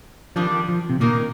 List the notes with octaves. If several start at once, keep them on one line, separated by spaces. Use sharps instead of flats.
F2 D#3 F3 G3 D4
F3
C3
A#2 D#3 A#3 D#4 A#4